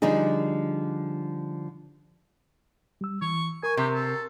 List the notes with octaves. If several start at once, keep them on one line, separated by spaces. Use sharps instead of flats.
D3 F3 G3 D#4 G#4
G3 E6
E3 C#6
A#4 G#5 C#6
C3 G4
A4